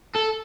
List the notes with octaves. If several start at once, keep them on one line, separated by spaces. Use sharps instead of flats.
A4